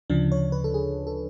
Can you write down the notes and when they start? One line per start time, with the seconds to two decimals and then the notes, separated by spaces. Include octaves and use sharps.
0.10 D2 C#3 F3 D4
0.32 C#5
0.52 B4
0.64 A4
0.74 G#4
1.07 A4